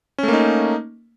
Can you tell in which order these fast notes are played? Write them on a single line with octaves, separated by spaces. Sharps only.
C#4 A3 A#3 D#4